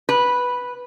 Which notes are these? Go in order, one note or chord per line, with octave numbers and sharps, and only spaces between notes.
B4